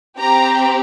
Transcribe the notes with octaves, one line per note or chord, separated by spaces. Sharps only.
C4 G4 A#5